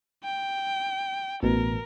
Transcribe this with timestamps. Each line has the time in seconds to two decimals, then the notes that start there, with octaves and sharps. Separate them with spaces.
0.24 G5
1.43 A1 B2 A#4